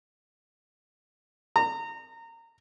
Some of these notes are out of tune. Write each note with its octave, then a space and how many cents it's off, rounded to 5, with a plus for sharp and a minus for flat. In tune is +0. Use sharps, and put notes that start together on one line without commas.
A#5 -25